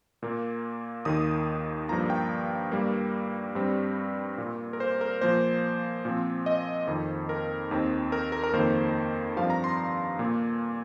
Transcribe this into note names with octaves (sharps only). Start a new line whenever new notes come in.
A#2 A#3
D#2 D#3 A#3 D#6
G2 F3 A#3 A#5
G5
G2 G3 A#3
G2 G3 C4
A#2 A#3
A#4
C5
A#4
A#2 F3 A#3 C5
A#2 F3 C4
D#5
F2 D#3 C4
A#4
D#2 D#3 C4
A#4
A#4
A#4
F2 D#3 A#3 C5
G2 F3 C4 F5
A#5
C6
A#2 A#3